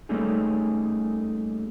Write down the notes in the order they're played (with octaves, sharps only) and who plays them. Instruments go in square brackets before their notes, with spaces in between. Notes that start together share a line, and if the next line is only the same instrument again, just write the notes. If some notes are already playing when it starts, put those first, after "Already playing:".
[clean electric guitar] G3 A3 A#3 C#4 D#4 G#4